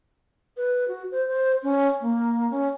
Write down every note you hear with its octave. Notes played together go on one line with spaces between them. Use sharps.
B4
F#4
C5
C5
C#4
A#3
C#4